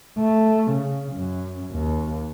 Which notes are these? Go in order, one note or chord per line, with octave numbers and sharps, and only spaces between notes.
A3
C#3
F#2
D#2